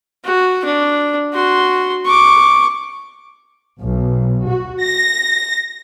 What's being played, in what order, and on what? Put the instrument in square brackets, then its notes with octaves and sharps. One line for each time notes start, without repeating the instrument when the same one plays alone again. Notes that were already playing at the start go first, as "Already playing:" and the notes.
[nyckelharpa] F#4
D4
F#4 C6
C#6 D6
[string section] B1
F#4
A#6